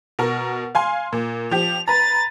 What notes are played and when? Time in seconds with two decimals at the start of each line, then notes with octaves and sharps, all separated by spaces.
0.19 B2 A#4
0.75 F5 G#5 C6
1.13 A#2
1.51 F3 G4 F7
1.88 B4 A#5 A6